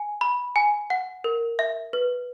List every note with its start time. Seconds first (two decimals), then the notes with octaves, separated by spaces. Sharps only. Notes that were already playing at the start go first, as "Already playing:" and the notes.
Already playing: G#5
0.21 B5
0.56 G#5
0.90 F#5
1.24 A#4
1.59 E5
1.93 B4